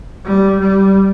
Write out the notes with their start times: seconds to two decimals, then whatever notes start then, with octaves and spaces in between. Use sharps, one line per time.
0.25 G3
0.59 G3